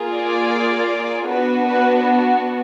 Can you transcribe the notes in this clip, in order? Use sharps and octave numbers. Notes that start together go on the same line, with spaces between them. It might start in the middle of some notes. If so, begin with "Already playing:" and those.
Already playing: A#3 F4 G#4
D5
B3 D4 F#4 B4
B4